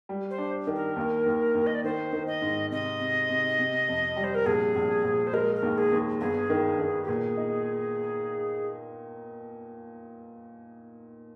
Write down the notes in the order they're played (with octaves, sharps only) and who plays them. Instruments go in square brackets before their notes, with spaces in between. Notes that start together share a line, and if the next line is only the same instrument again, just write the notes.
[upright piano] G3
[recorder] C5
[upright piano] D4
D#3
[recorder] A#4
[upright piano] D#2
D#2
D#2
[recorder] D#5
D5
[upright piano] D#3 [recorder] C5
[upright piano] D#3
[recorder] D#5
[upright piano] G#2
[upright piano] C3 [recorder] D#5
[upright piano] C3
C3
C3
F2
G3
[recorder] C5
A#4
[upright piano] A#1 [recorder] G#4
[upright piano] A#1
A#1
[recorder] C5
[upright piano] G#3 [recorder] A#4
[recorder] A#4
[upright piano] D#2
[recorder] G#4
[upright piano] D#2
[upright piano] G1 [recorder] G#4
[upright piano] D#3
D#3
[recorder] G4
[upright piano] A#2 [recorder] G#4
[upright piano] D#4